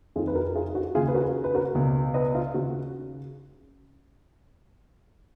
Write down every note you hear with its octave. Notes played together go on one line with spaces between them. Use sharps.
F2 D#3 F4 G#4
B4
F#4 A#4
F4 G#4
F#4
D#2 C#3 F4 G#4
B4
F#4 A#4
B4
F#4 A#4
C#2 B2
B4 D#5
F4
D#2 C#3 F#4